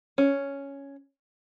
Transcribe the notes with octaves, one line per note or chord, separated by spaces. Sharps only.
C#4